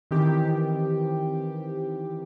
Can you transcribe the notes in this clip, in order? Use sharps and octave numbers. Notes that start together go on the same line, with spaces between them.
D#3 E3 C4 G4